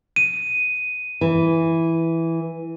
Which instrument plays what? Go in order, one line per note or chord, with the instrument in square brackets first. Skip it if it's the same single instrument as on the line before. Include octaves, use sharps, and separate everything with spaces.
[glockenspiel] D#7
[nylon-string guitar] E3